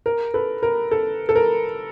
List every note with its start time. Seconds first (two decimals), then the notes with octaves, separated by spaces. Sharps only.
0.06 A#4
0.34 A4 B4
0.63 A#4
0.91 A4
1.29 A4
1.35 A#4